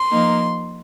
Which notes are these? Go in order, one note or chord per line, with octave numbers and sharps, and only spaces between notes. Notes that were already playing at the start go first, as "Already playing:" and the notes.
Already playing: C6
F3 A#3 D#4